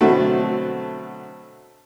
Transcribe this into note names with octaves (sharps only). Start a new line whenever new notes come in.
B2 D3 F#3 A3 C4